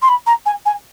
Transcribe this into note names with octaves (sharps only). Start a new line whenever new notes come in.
C6
B5
A#5
G#5
G#5